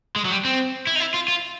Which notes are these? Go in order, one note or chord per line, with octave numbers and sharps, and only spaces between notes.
G#3
F#3
G3
C4
E4
D#4
E4
F4
F4